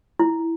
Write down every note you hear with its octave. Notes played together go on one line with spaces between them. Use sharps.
E4